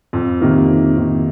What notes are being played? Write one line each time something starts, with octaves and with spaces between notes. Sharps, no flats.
F2
C3 D#3 A#3
F2
C3 D#3 A#3